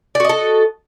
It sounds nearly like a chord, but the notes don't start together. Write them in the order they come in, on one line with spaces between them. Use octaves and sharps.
D5 F#4 D#5 A4